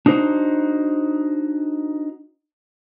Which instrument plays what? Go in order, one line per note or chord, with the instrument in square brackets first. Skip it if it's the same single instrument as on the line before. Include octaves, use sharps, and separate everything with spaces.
[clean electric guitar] D4 D#4 F#4 C5